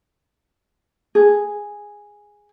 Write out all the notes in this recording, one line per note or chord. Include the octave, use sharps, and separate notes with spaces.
G#4